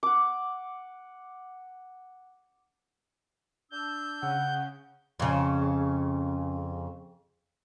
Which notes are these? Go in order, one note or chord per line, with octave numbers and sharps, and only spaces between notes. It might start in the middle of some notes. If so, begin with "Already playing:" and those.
F#5 D6
D4 E6 G6
C#3 F#5
F2 C#3